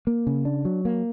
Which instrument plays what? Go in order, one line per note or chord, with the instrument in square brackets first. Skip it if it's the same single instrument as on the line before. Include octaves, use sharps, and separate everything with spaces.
[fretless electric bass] A#3
C#3
D4
F#3
A#3